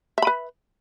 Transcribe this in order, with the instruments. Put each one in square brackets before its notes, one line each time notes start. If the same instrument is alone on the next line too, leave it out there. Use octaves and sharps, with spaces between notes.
[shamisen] E5
B5
B4